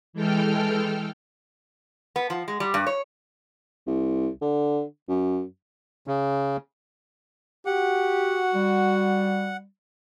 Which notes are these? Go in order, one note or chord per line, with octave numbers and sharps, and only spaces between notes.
E3 G#3 A4 G5 F6
B3
F3
G#3
G3
G2
C#5
C2
D3
F#2
C#3
F#4 G4 F#5
G3